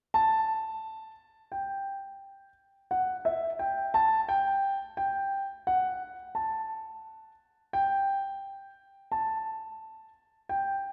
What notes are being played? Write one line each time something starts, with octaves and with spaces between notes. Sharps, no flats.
A5
G5
F#5
E5
G5
A5
G5
G5
F#5
A5
G5
A5
G5